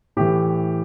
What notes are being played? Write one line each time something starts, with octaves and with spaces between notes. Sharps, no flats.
A2 E3 G4